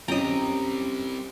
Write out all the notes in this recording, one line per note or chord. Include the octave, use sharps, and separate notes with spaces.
F#2 G3 C4 C#4 G4 D#5 A#5